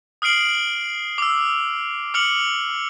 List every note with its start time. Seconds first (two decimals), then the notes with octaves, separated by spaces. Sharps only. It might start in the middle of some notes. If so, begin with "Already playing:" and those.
0.22 D#6 F6 C7 D7 F#7
1.18 D6 E6
2.14 D6 F6 C#7 F#7